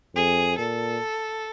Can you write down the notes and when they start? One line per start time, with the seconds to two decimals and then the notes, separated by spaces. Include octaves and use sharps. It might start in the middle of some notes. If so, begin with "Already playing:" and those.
0.15 F2 G#4
0.58 A#2 A4